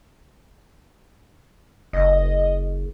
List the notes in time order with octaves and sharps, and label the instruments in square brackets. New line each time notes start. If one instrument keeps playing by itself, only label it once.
[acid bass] F#1 [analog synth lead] D#5